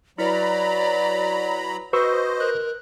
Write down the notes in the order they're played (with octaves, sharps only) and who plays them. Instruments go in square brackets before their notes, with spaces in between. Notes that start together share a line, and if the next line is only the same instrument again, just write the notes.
[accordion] F#3 A#5 B5 [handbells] E4 B4 [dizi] D5
[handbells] F#4 C6 [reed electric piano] B4 C#6 E6 [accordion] C5 D#5
[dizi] A#4 [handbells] F#6